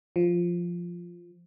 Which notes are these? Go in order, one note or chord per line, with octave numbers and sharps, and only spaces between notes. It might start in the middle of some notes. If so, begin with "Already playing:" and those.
F3